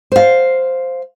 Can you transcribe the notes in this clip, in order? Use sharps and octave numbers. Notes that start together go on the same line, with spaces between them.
C5 F5